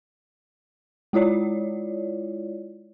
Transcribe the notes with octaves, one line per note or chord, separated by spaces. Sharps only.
G#3 E4 F4 C#5 D5